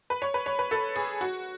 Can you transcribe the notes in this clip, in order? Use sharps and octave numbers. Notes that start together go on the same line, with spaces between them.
B4
C#5
B4
C#5
B4
A4
G#4
F#4